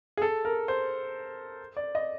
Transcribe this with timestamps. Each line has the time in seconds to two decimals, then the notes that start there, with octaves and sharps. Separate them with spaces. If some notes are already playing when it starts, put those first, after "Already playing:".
0.17 G#4
0.22 A4
0.45 A#4
0.68 C5
1.77 D5
1.95 D#5